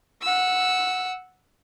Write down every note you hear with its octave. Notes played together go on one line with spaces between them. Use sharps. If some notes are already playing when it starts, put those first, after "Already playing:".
F#5 E6